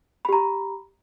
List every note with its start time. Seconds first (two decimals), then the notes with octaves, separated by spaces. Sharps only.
0.25 B5
0.29 G4
0.33 A#5